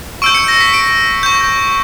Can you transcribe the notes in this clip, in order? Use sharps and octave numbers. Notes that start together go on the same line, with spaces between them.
C#6 E6 G6 D7
C#7
A#6
B6
D7
C#6 G6